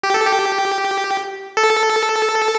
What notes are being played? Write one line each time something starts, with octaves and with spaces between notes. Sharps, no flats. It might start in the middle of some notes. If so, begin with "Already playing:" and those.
G4
A4
G4
A4